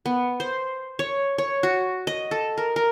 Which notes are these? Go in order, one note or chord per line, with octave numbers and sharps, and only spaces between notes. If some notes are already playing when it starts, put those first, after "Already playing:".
B3
C5
C#5
C#5
F#4
D#5
A4
A#4
A#4